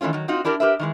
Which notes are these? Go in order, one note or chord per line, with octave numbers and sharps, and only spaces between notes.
D#3 E3 A3 C#4 F4
D#3 F#3
C4 D#4 F4 F#4
D4 E4 G4 A#4 D5
G4 A#4 B4 E5
D#3 E3 G#3